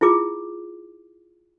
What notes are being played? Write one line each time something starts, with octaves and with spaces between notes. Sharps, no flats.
E4 F4 G#4 D6